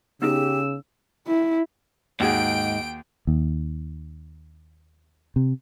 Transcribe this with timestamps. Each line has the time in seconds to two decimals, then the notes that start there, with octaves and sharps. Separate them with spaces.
0.22 C#3 B3 D#4 G4 G#4 E6
1.27 E4
2.20 D#2 G#2 F#4 G#4 G5 D7
3.27 D#2
5.36 C3